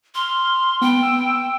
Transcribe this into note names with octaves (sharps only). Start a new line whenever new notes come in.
C6 F6
B3 G5
E6